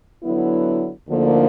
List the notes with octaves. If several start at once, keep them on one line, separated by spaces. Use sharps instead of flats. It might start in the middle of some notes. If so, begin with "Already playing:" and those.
D3 F#3 B3 E4
D2 D3 F3 A#3 D#4